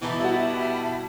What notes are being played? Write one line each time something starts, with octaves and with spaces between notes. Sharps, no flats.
B2 E3 D#4 G4 E5 A5 B5
G3 E4 F#4